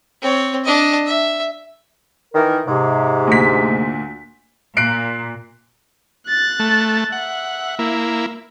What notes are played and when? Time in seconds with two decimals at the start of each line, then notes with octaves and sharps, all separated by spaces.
0.22 C4 C#5
0.65 D4 D#5
1.07 E5
2.34 D#3 E3 A#4
2.67 G#2 C3
3.27 D2 A#2 B6
4.77 A#2 F#6 C7 D7
6.28 F#6 A6
6.59 A3
7.12 E5 F#5
7.79 A#3 E4